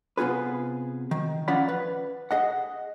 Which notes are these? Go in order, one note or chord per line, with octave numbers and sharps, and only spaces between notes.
C3 B3 F4 G#4 B4
D#3
F3 C#4 F4 D5 F#5 B5
B4
G#4 D#5 F#5